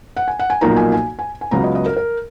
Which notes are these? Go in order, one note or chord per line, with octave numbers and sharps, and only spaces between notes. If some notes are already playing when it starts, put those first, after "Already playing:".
F#5
G#5
F#5
G#5
B1 A#2 F3 A#3 D#4 A#5
G#5
G#5
G#5
G#5
C#2 C#3 F#3 B3 F4 A#5
D#5
D#5
A#4
A#4